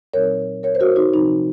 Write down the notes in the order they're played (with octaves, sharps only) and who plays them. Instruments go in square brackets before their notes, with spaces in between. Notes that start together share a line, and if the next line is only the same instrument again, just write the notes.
[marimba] A#2 F#3 C4 D#4 A#4 C#5
A#4 C#5
C5
F#4 A#4
D#4 F#4
C3 F3 C4 D#4